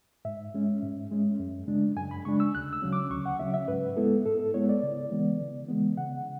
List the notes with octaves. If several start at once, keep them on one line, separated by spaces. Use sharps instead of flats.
G#2 E5
G#3 C#4
G#2
G#3 C#4
F#2
C#3 G#3 D4
F#2 G#5
B5
C#3 G#3 D4 C#6
E6
D2 F#6
E6
C#3 F#3 C#4
D6
D2 C#6
F#5
C#3 F#3 C#4 E5
E5
G#2 B4
G#3 B3 E4 A4
G#2 A4
A4
G#3 B3 E4 C#5
D5
C#3
E3 G#3 B3
C#3
E3 G#3 B3
C#3 F#5